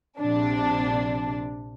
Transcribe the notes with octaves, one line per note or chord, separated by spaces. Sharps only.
A#1 C3 D4